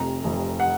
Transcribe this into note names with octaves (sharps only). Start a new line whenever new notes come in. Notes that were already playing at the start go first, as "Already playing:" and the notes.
Already playing: F1 F2 C3 A#5
F1 F2 C3
F#5